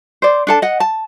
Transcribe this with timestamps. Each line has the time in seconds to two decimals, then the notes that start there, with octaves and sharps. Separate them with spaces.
0.22 C5 D5
0.47 D4 A4 A5
0.62 D#5 F#5
0.80 A5